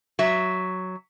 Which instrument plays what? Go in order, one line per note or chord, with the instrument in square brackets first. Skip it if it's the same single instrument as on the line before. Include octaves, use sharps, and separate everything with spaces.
[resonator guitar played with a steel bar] F#3 E5